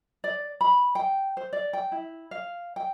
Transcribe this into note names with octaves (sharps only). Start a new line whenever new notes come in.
D5
B5
G5
C5
D5
G5
E4
F5
G5